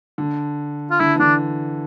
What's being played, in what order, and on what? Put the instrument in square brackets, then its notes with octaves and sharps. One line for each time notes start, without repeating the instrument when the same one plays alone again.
[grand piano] D3
[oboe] F4
[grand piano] D3 [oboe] E4
[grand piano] E3
[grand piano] D3 [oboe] D4